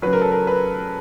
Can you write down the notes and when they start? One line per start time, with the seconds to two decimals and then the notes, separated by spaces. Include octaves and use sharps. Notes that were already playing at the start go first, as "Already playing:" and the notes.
0.02 C#3 F#3 B4
0.13 A#4
0.22 A4
0.32 A#4
0.47 B4